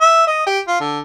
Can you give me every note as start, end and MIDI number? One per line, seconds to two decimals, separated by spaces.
0.01 0.24 76
0.27 0.42 75
0.47 0.59 67
0.67 0.76 65
0.80 1.00 50